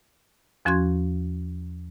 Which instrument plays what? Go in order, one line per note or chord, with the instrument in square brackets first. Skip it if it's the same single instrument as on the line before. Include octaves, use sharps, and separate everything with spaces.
[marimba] E2 F3 C#4 F#4 C6 G#6